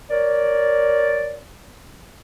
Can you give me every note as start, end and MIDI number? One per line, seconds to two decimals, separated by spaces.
0.10 1.41 70
0.10 1.41 73
0.10 1.41 74